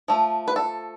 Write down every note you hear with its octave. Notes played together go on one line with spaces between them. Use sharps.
F3 A3
B4
A4